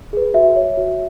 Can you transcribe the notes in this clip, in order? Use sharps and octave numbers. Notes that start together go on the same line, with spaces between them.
G#4 B4
F#4 E5
C#5
F#4